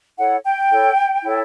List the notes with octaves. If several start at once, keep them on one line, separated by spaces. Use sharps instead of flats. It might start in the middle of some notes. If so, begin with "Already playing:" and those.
E4 A4 C#5 F#5
G5
E4 A4 C#5
E4 A4 C#5